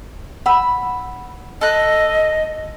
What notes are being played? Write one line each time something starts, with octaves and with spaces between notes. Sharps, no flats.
F#5 B5 E6
A4 D#5 F#6